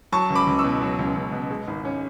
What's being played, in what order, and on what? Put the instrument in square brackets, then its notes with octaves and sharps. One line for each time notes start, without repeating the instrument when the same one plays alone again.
[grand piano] F#3 A5 C#6
C#2
B5 D6
C#2
C#6 E6
B2
F#3
C#2
C#2
B2
G#3
G#1
C#4